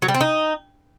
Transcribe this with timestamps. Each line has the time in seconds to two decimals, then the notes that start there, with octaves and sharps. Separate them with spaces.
0.02 F#3
0.08 G3
0.14 C4
0.21 D#4